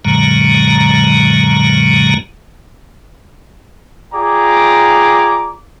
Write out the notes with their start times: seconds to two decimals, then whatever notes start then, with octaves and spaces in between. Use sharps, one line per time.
0.05 F#2 A#2 D3 F#3 G#3 A#5
4.13 F4 G#4 D5 G5 A#5 D6